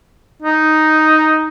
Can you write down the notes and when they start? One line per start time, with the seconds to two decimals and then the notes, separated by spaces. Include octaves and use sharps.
0.42 D#4